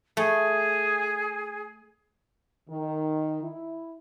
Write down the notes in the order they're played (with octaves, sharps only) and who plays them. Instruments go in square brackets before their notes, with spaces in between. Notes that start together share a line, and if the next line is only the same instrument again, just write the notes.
[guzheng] A3 [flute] G#4
[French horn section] D#3
E4